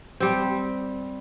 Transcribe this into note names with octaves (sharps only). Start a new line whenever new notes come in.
G3 C4